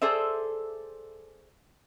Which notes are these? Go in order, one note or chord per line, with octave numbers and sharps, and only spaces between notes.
G#4 A4 C5 D5 E5